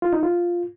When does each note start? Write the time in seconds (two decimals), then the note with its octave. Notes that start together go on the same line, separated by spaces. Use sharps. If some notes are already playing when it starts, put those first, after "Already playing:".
0.02 F4
0.13 D#4
0.23 F4